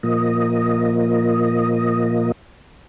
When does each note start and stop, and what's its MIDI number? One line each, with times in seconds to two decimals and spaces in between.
0.03 2.32 46
0.03 2.32 53
0.03 2.32 58
0.03 2.32 75